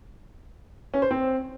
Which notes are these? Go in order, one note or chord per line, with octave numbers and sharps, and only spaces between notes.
C#4
C5
C4